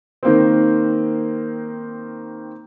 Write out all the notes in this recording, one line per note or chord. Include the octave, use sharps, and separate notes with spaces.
D#3 A#3 C4